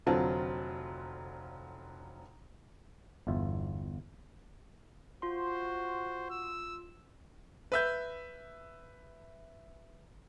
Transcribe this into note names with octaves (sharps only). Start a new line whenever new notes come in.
F1 D3 F#3 C4 F4 A5
G1 E2 F4 E5
F4 F#4 C5 C6
E6
B4 E5 G6